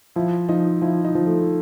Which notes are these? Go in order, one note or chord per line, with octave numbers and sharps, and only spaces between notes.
F3 E4
F3 D#4
F3 E4
D#4
F3
A3